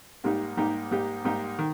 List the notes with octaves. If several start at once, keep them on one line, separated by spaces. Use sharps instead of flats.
G#2 G3 A#3 D#4 G4
G#2 G3 A#3 D#4 G4
G#2 G3 A#3 D#4 G4
G#2 G3 A#3 D#4 G4
D#3